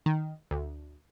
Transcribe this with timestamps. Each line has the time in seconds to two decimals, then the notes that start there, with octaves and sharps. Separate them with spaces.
0.06 D#3
0.51 D2